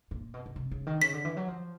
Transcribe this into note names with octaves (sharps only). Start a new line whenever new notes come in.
A#2
B2
B2
C3
C#3
D#3
C#3 B6
D3
E3
F#3
F3